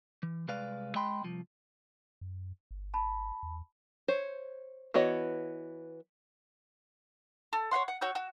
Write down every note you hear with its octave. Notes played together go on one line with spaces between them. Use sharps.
E3
C2 G#3 B4 D5 F5
G#3 D#5 G5 B5 C6
C2 F3
F#2
G1
A5 B5
E2
C5 C#5
E3 B3 F#4 C#5 D#5
A4
C#5 F5 F#5 C6
F#5
F#4 C#5 E6 G6
F#4